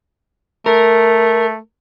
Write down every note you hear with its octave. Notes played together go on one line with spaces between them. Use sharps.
A3 A#4